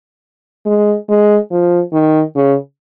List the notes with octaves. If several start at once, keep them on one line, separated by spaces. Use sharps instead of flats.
G#3
G#3
F3
D#3
C#3